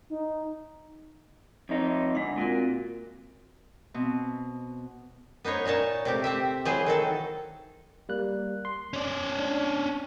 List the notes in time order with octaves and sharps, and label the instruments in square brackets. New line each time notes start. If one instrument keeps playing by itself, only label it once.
[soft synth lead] D#4
[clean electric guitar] F2 D#4 [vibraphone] C#5
[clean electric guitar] D2 [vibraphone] G#3 D4 F#5
[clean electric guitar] A#2 [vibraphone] C4 F#4 A#4
[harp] B2 C4
[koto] B3 D#4 C5 C#5
A#2 D#4 C#5 A5
C3 A3 G4
C4 G4 E5
E3 F#3 A3 G#4 C5
D#3 F#3 A4
[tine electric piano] G3 A#3 F#6
C6
[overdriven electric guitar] C#4 D5
[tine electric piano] D4